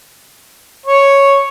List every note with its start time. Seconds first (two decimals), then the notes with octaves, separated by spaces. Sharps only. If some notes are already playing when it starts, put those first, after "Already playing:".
0.86 C#5